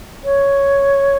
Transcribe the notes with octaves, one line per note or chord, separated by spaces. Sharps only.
C#5